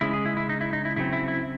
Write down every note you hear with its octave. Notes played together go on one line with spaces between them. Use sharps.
C#3 G#3 C#4 E4
G#4
E4
E4
D#4
E4
D#4
E4
C#3 F#3 C4 E4
E4
E4